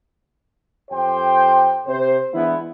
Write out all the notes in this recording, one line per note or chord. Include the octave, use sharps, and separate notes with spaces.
F2 G4 C5 G5
C3 C5
E3 G#3 B3 D4 E4